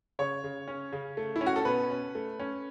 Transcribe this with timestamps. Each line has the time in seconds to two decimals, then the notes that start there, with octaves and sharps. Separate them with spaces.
0.19 C#3 C#5
0.44 C#3
0.68 C#4
0.92 C#3
1.17 A3
1.36 E4
1.41 C#4
1.46 F#4
1.56 A4
1.65 B2 B4
1.90 C#4
2.15 A3
2.40 C#4